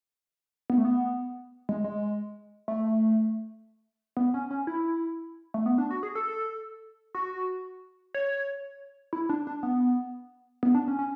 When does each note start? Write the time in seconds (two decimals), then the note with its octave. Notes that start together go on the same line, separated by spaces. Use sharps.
0.70 B3
0.78 A3
0.85 B3
1.69 G#3
1.84 G#3
2.68 A3
4.17 B3
4.34 C#4
4.51 C#4
4.67 E4
5.54 A3
5.66 B3
5.78 D4
5.91 F#4
6.03 G#4
6.15 A4
7.15 F#4
8.14 C#5
9.13 E4
9.29 D4
9.47 D4
9.63 B3
10.63 B3
10.75 D4
10.88 C#4
10.99 C#4